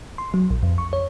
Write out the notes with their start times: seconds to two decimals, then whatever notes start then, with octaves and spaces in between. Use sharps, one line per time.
0.18 C6
0.34 F#3
0.50 A#1
0.63 F2
0.78 C#6
0.93 C#5